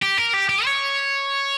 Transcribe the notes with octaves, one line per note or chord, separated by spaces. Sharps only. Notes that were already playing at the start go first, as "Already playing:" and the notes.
G4
A#4
G4
G4
C#5